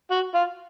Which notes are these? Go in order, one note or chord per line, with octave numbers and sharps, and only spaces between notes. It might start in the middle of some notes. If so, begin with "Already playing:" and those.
F#4
F4